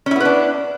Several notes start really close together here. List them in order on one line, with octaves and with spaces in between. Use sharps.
C#4 E4 B3 B4 D4